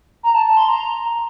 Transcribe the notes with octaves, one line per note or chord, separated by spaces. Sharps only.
A#5
A5
A5
C6
A#5